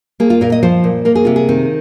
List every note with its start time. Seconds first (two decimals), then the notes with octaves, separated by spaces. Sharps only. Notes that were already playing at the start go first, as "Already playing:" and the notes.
0.20 A#3 G#4
0.30 F4
0.41 A#2 A#4
0.52 D#5
0.63 F3 C5
0.84 A#2
1.05 A#3 A#4
1.15 G#4
1.25 C3 F4
1.36 G#4
1.49 D#3 C4